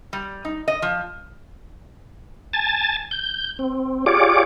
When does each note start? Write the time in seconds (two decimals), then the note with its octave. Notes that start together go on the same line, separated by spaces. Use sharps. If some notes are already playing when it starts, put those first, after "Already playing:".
0.13 G3
0.45 D#4
0.68 D#5
0.82 F3
2.53 G#5 A5 A6
3.11 G6
3.59 C4
4.06 F4 G4 G#4 C#5 D5 D6